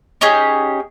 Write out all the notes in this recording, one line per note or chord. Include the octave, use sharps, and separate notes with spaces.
C#4 D#4 G4 G#4